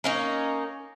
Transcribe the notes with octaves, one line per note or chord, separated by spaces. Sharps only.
A#3 C#4 D#4